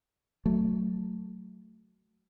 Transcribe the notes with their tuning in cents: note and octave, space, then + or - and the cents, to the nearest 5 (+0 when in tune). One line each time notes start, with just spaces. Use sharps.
F#3 +5 A3 +5